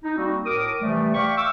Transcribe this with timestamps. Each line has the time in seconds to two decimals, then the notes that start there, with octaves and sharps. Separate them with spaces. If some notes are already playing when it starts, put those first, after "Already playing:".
0.03 D#4
0.17 G3 A#3 C4 D#4 F#4
0.46 A2 A#4 D6 D#6
0.81 C3 E3 F3 G3 A3
1.14 D5 F5 G5 B5 C#6
1.37 E5 F5 G5 D6 E6